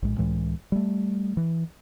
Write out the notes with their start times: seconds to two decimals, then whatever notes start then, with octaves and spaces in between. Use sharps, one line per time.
0.02 A#1 A2 G#3
0.18 C#2 A2 E3 G#3
0.72 G3 A3
1.37 E3